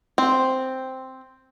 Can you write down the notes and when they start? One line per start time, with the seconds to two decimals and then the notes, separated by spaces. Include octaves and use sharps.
0.18 C4